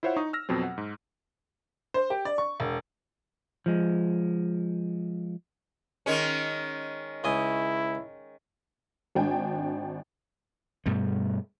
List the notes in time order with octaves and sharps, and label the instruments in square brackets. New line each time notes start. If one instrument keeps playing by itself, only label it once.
[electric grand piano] E4 F4 C5 C#5 E5 F#5
D#4 C#6 D#6
E6 F6 A#6
F2 B2 F#3 C4
F#5
G#2
[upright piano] C5
G4
D5
C#6
E1
[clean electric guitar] F3 G#3
[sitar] D#3 G#3 C#4
[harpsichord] C#2 D#5 G#5 [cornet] E4
[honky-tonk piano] G#1 D4 G5 G#5
[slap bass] G2 B2 G3 A3